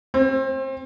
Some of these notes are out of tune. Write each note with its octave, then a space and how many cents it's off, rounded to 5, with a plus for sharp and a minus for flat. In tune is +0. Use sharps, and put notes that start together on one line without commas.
C4 +30